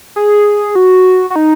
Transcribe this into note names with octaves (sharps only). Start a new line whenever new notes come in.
G#4
F#4
F#4
D#4